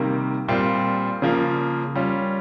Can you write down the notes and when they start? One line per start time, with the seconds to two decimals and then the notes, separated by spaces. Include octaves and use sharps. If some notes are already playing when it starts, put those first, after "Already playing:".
Already playing: C3 D#3 G3 A#3
0.48 A#2 G3 C4 F4
1.22 C#3 F3 A#3
1.95 G3 C#4 F4